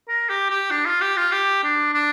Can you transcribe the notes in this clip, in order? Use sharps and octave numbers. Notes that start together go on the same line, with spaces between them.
A#4
G4
G4
D4
F4
G4
F4
G4
D4
D4